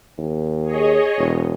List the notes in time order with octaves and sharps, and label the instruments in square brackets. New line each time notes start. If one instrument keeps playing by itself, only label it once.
[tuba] D#2
[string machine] G#4 C#5 D#5
[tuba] E1